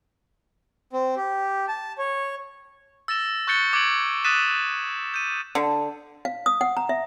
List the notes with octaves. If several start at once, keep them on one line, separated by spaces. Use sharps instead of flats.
C4
G4
A5
C#5
E6 A6 A#6 E7 G7
C#6 F#6 G6 A6 C#7 G7
D6 G#6 D7 F#7
D#6 F#6 A6 B6 D#7 E7
G6 D#7
D3
F5
D#6
F#5
A#5
E5